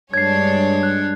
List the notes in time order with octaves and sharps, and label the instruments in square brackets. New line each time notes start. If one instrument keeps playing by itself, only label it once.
[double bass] G2 G#3 [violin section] D4 C#5 [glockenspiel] G#6 C7
[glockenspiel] F#6